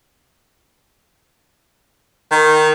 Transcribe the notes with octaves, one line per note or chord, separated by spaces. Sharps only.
D#3